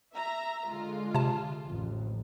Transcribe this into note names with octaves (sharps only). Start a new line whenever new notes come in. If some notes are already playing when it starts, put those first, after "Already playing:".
E5 A#5
D3 G#3 F4
C3 A5
A1 F2